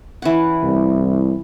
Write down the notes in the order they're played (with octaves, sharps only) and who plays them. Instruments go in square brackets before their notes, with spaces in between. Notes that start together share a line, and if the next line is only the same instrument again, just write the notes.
[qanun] E3 C#4 F#5
[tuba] C2